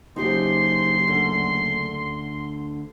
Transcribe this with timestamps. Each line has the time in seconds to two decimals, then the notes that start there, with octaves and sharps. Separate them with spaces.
0.16 F#1 D#4 G4 C5 C6
1.07 D2 D3